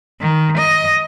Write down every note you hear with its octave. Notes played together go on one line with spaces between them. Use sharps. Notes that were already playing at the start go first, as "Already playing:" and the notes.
D#3
D#5